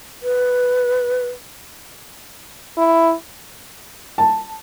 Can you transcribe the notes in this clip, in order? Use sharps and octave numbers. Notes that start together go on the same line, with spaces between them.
B4
E4
A5